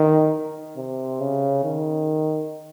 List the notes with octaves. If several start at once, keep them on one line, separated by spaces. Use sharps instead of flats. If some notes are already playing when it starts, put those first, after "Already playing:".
Already playing: D#3
C3
C#3
D#3